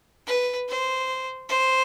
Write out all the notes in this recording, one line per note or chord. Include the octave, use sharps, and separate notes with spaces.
B4
C5
C5